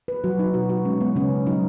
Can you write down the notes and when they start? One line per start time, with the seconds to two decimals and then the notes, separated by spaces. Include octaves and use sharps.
0.08 B4
0.24 F#3 F#4
0.39 D#4
0.54 B2 F#4
0.69 F#4
0.85 G#3 C#4
1.01 B3
1.15 C#3 C#4
1.47 F#3 D#4